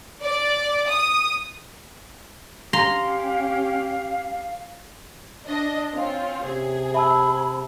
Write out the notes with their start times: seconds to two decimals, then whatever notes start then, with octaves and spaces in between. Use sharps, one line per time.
0.22 D5
0.89 D#6
2.73 C#4 G4 F5 A#5 C6
5.47 D4 D#5
5.95 C4 C#4 F4
6.44 C3 G#4
6.94 E5 A5 B5 E6